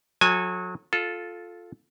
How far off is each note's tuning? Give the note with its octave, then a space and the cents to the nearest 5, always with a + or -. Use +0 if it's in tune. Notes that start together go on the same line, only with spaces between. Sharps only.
F#3 -30 A4 +0 G#5 +0
F4 +10 A4 -10